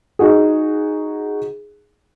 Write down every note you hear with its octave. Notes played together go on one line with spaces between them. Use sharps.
D#4 F#4 G#4